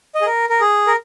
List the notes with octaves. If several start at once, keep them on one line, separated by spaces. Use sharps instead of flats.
D#5
G#4
A#4
A#4
G#4
A#4